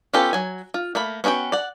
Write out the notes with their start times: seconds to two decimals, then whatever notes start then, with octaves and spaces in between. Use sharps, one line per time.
0.13 B3 C#4 F4 G4 A4
0.33 F#3 G#5
0.74 F4
0.95 A3 A#3 B5
1.24 B3 C#4 F#4 G#4 G5
1.52 D5 F#5